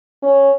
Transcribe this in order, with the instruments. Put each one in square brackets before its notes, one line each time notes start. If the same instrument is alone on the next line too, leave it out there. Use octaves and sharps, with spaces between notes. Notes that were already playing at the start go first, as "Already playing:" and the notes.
[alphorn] C#4